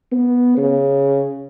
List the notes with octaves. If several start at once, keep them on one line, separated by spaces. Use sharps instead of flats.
B3
C#3